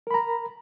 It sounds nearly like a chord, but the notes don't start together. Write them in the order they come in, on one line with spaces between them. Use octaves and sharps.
A#4 B5 A#5